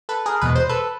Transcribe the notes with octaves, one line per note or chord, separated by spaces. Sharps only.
A4 B4
G#4 A#4
E2 B2 G#3 B4
C5
A4 B4